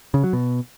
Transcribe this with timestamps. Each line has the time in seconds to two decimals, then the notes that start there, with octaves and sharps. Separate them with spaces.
0.14 C#3
0.24 F#3
0.33 B2